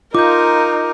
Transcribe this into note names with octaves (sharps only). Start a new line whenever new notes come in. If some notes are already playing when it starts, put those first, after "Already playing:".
D#4 F4 A#4 D6 G6